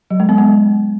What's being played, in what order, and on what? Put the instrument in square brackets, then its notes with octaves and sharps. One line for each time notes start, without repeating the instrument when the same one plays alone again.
[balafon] F#3
G#3
B3
G#3